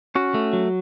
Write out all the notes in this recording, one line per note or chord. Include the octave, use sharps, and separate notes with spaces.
C#4 F#4
A3
F#3